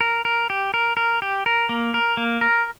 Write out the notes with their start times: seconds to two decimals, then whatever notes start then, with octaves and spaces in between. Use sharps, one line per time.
0.01 A#4
0.25 A#4
0.50 G4
0.74 A#4
0.97 A#4
1.22 G4
1.46 A#4
1.69 A#3
1.94 A#4
2.17 A#3
2.41 A#4